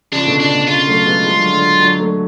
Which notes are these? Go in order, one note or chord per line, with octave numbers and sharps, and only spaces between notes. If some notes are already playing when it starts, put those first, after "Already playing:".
C#3 F3 D4
B2 D3
C#3 D4
B2
C#3 F4
F#3 A3
G#3 B3
F3 G#3
D3 F#3
D3 F#3
D3 F#3
F#3 A3